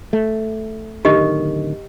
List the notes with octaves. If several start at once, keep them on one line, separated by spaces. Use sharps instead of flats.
A3
D1 D3 D#3 G4 D#5